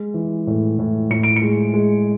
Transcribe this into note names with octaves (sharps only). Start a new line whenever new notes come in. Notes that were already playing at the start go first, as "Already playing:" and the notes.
Already playing: G#3
E3
A2
A2
A2 C#7
D7
C#7
G#3
G#3